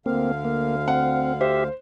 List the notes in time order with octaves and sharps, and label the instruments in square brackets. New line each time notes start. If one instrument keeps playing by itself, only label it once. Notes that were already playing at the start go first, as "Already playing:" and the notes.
[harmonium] D2 D3 F5 [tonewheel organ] A#3 C4
[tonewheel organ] A#3
[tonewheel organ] C4 [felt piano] F#5
[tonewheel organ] G4 E5 [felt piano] C5